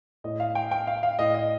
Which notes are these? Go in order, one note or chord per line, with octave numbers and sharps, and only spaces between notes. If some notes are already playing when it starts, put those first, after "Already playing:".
A2 D#5
F5
G5
G5
F5
F5
A2 D#5
D#5